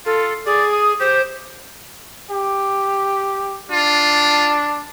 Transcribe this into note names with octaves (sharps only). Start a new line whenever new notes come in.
F4 A4
G#4 D5
D#6
G4 C5
G4
D4 F4